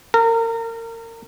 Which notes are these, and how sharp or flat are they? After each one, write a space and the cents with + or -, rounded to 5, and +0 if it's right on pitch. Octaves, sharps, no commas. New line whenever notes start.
A#4 -30